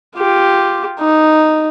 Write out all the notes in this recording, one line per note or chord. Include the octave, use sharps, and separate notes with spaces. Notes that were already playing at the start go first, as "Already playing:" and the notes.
F4 G4
D#4